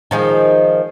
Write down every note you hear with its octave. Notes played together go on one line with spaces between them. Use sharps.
D#3 F3 G#3